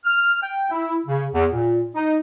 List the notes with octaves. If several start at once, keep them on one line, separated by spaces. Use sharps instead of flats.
F6
G5
E4
C#3
E2
A#2
D#4